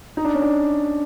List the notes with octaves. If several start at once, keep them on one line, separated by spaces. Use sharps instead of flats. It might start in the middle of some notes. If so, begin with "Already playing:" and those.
D#4
D4
C#4
D4